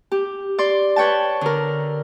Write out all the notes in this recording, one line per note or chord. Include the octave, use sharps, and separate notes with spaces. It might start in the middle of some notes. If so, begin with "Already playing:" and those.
G4
D5 C6
B4 C#5 G5 A5
D3 A#4